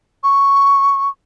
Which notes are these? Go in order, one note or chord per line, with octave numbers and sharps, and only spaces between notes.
C#6